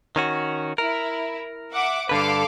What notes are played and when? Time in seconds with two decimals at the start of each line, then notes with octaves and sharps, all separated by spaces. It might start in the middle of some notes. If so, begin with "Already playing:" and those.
0.16 D#3 C#4 F#4
0.78 E4 A#4
1.72 E5 F#5 D6
2.09 G2 D3 A4 B4 F5 D6